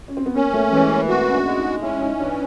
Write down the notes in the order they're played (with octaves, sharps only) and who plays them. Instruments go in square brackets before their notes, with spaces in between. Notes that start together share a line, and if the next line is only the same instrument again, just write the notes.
[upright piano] C#4
C4
B3
[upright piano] A#3 [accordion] C#4
[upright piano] A3
[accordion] E3 [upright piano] G#3
[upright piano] A#3
[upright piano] C4 [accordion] F#4
[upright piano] C#4
D4
[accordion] G#3
[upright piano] D#4
[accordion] C#4 [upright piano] E4
[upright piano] D#4
[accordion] E3 [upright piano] D4